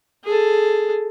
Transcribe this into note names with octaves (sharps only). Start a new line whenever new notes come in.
G#4 A4